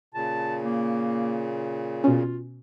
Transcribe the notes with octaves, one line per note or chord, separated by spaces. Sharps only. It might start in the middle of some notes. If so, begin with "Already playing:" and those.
A#2 C#3 A5
A#3
B2 C#4 F4